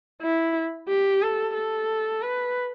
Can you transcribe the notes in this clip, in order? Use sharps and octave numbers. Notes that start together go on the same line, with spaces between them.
E4
G4
A4
A4
B4